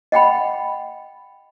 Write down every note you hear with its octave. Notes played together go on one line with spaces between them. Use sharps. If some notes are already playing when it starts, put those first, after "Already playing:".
D#5 F#5 G5 B5